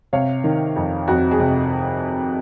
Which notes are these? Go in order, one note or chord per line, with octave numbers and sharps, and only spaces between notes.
C3 C#5 F5
D#3
F2
F2 F#4
G#4
C3